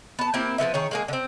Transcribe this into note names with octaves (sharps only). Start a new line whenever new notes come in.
B3 A5
A#3 C4 E4 G4
F3 G#3 B3 E5
D#3 G#4 C#5
G#3 A#3 G#4
D3 C4